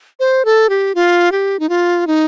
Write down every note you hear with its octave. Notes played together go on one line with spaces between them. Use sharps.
C5
A4
G4
F4
G4
D#4
F4
D#4